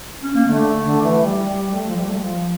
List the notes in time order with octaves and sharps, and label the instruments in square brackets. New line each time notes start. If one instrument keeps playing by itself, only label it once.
[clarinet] C#4
A#3
[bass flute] D3 [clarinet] A3
[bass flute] D3
E3
G3
G3
A3
F3
G3
A3
G3
F3